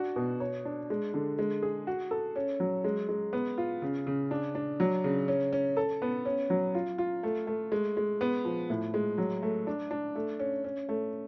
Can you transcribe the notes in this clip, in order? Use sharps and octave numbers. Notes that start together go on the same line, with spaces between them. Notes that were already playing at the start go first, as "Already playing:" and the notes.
Already playing: D4 F#4
B2
C#5
D4
G#3
D3
G#3
G#4
F#4
A4
C#4
F#3
G#3
G#3
B3
F4
C#3
C#3
D4
D4
F#3
C#3
C#4
C#4
A4
B3
C#4
F#3
F4
F4
A3
A3
G#3
G#3
B3
F3
A2
G#3
F#3
A3
D4
D4
A3
C#4
C#4
A3